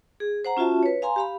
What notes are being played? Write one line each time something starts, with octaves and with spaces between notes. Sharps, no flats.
G#4
C5 F#5 A#5
C#4 F4 F#4 E5 A5
B4 C#5
F5 G#5 A#5 C6
G4 F5 B5